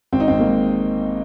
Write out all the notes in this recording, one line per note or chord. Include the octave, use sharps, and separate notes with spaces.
G#1 C4
D#4
G#1 C4
A#3
G#2